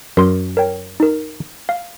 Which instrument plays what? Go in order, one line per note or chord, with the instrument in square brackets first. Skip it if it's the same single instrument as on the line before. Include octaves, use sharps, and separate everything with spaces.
[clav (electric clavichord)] F#2 [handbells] A#4 C6
[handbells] A#4 C#5 G5
D#4 A#4
F5